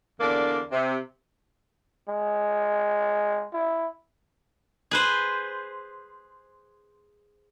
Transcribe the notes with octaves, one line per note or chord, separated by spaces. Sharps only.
E2 D3 A#3 D4 D5
C3
G#3
E4
G#4 B4 C5